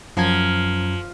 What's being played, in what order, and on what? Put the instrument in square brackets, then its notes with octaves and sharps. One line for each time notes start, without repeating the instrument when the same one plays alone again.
[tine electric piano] F#2 A#5 G#6 [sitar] F3